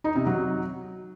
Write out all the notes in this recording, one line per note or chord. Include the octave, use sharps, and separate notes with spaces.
D#4
C3
F#3